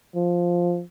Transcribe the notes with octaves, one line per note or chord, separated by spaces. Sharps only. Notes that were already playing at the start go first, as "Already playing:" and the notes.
F3